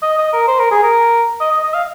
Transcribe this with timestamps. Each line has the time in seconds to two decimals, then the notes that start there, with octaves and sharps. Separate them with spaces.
0.02 D#5
0.18 D#5
0.33 A#4
0.48 C5
0.59 A#4
0.71 G#4
0.83 A#4
1.40 D#5
1.51 D#5
1.63 D#5
1.74 F5